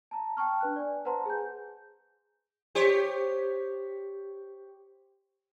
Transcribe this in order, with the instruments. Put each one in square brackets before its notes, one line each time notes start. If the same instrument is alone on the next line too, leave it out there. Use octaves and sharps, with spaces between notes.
[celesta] A5 A#5
G5 A5 C#6 F6
D4 B4 F#6
D5 G#5
B4 C5 F#5 A5 A#5 C6
G#4 G#5 G6
[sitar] G4 C5 C#5